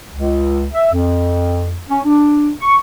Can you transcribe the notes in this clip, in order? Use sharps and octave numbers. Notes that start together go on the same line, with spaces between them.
C#2
E5
F2
C#4
D4
C#6